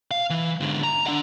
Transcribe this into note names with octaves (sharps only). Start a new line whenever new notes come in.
F5
E3
G#2 D3
A#5
D4 F#5